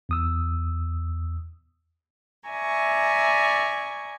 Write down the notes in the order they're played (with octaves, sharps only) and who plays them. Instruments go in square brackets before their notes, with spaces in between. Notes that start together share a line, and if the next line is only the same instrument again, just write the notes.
[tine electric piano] E2 D#6 E6
[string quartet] D5 E5 G#5 A#5 C#6